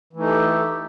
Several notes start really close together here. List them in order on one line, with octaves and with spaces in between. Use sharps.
E3 A3 D#4 A4 G4